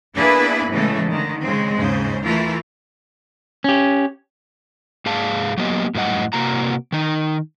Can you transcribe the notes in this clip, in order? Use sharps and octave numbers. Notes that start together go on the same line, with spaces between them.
A#3 B3 D4 E4 G#4 B4
A2 C#3 E3 G#3 A3
D3 D#3
C#3 G#3 C4
D#2 G#2 C#3 C5
E3 A3 E4 F4 A#4
C#4 G4
G#2 G#4 F5 A5
F#3 A#3 B3 G4 D#5
F#2 A2 G3 D#5 F#5
C3 A#3 F#4 A#5
D#3 D#4